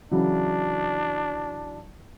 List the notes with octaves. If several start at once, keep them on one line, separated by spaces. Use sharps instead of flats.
C#3 E3 F#3 D4